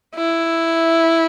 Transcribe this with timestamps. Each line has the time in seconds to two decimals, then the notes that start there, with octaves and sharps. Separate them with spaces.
0.15 E4